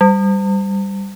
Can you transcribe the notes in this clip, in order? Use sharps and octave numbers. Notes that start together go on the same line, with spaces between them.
G3